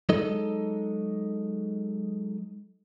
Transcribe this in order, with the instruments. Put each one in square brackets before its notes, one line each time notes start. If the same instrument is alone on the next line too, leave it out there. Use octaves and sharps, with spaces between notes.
[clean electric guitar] F#3 G#3 D#4 A4 D#5